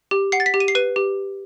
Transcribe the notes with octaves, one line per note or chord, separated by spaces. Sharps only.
G4
F#5 C7
A6
B6
G4
D#7
C7
B4 D#7
G4